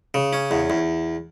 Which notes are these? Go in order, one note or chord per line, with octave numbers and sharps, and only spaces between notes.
C#3
C#4
E2
E2